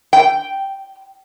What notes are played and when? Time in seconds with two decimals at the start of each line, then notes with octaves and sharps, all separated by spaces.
0.13 G5